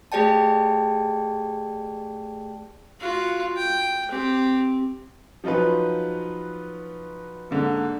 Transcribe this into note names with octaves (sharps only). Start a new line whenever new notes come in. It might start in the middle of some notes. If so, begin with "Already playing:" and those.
A3 G4 G#4 D5 G5 A5
F4 F#4
G5
C4 G4
F3 F#3 D#4 F4 B4
G#2 D3 A#3